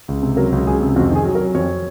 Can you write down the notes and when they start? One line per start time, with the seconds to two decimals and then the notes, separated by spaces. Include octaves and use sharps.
0.08 C#2
0.23 C3
0.37 F#3 A#4
0.52 C#2
0.67 C#2 G#4
0.81 C3
0.96 F2 F#4
1.11 D#3 G#4
1.25 F#3
1.35 A#4
1.40 F#3
1.55 F2 C#5